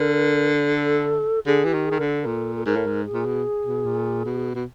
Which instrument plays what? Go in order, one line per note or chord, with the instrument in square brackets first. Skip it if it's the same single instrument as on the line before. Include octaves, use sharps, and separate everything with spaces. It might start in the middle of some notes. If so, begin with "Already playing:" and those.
Already playing: [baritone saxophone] D3 [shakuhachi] A#4
[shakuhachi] A4
[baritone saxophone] D3 [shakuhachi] G#4
[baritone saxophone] E3 [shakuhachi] G4
[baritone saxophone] D#3
[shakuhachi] G#4
[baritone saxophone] D#3
[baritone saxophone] D3 [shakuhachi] A#4
[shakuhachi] A4
A#4
[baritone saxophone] A#2 [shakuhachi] A4
[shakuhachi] A4
[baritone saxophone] G#2 [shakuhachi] A#4
[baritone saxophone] A2
G#2
[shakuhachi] G#4
[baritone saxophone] A#2
B2
B2
A#2
B2
B2